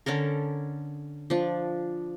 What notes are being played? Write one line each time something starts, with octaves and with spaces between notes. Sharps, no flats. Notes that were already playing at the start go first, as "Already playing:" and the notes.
D3 C#4 A4 A#4
F3 D4